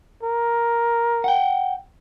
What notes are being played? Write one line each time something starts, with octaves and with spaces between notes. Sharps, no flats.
A#4
F#5 G5